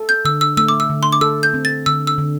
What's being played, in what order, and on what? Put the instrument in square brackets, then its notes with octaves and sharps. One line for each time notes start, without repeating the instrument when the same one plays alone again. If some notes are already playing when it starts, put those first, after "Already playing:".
Already playing: [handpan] A4
[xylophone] G6
[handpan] D3 [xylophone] E6
[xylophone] E6
[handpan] A3 [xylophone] E6
[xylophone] D6
E6
[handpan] D3
[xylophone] C6
D6
[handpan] A4 [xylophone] E6
[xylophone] G6
[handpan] C4
[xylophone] A6
[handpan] D3 [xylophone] E6
[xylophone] E6
[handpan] D3